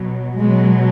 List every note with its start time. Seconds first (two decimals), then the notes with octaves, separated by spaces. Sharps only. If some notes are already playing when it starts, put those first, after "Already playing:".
Already playing: B2 F#3
0.40 B2 F#3 G#3